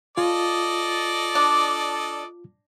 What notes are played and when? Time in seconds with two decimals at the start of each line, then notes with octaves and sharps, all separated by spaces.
0.18 F4 A4 D5 D#5
1.35 D4